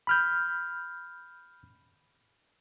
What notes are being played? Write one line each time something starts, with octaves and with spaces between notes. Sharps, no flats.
B5 F6 G6